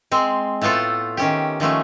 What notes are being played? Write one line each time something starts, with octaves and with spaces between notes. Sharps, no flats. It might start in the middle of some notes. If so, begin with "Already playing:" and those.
G#3 C4
A2 A3 B3 F4 A4
D#3 C#4 G4
D#3 F3 A3 C#4